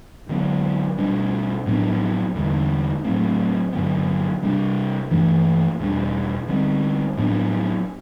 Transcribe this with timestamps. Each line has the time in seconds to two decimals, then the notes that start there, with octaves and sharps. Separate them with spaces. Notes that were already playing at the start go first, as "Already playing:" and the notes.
0.29 D3 F#3 B3
0.98 B2 G3 D4
1.66 A2 F#3 B3 D4
2.35 E2 D3 G3
3.04 A2 F#3 A3 C4
3.73 G2 D3 F#3 B3
4.43 C3 G3 D4
5.11 G2 E3 A3 D4
5.79 E2 B2 G3 D4
6.48 D3 G3 C4
7.18 A2 F#3 B3 D4